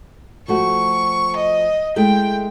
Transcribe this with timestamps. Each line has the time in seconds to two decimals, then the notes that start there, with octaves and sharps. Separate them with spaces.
0.48 F3 A3 F#4 C#6
1.36 D#5
1.96 G#3 A3 E4 G5